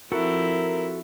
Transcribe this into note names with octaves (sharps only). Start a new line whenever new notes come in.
F3 C4 E4 F#4 A4 A#4 F#5